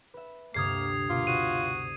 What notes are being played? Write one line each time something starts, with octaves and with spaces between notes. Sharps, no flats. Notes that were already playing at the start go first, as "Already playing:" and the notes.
B4 E5
D2 G2 C3 A#3 D#6 G#6 C7
B2 A#3 F4
E4 F#4 C5 D5 D#7